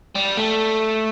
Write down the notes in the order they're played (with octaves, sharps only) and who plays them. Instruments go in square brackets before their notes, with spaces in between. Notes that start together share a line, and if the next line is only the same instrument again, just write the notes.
[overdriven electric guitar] G3
A3